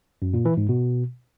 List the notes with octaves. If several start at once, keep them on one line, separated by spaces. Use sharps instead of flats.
F#2
A#2
E3
G#2
B2